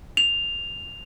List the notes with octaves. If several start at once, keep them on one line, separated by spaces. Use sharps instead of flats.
F7